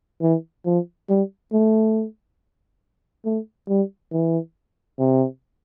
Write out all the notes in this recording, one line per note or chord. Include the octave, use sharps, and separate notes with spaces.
E3
F3
G3
A3
A3
G3
E3
C3